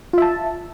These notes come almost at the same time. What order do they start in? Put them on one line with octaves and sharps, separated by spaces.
F4 E5 A5